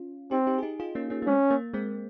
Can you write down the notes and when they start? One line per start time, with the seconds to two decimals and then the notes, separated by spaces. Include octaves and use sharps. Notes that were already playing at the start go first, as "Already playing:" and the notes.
Already playing: C#4 F4
0.31 C4 D#4 G4
0.47 D#4 G4
0.58 G#4
0.63 D#4 G4
0.80 F4 G#4
0.95 A#3 C#4
1.10 A#3 C#4
1.22 A#3
1.27 G#3 C4 C#4
1.51 A#3
1.73 G#3 C4